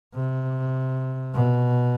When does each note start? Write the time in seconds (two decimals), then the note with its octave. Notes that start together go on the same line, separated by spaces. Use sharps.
0.14 C3
1.34 B2